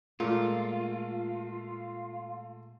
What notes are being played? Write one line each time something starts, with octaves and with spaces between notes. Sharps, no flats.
A#2 G#3 A3 F4